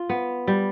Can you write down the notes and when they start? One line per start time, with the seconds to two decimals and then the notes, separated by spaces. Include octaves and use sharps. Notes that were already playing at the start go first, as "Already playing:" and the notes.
Already playing: F4
0.09 B3
0.48 G3